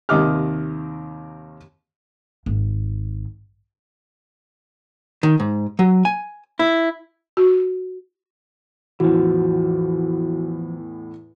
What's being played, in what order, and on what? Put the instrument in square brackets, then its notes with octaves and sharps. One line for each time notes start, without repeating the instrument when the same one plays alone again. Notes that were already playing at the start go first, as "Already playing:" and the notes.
[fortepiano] D#2 C3 D#3 D#5 D6 F6
[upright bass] G#1
[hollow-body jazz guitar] D#3
G#2
F#3
G#5
E4
[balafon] F#4
[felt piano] E2 A2 [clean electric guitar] E3 F3 [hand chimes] F#4